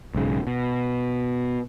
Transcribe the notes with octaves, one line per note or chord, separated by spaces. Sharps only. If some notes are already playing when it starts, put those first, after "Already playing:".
B1 G#2 C#3
B2